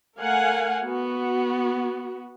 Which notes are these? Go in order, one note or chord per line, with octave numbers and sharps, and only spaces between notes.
A3 A#4 F5 F#5 G#5
B3 F#4